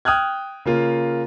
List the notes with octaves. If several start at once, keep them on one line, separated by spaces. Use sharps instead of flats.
G5 D#6 F6 F#6 G#6
C#3 A#3 F4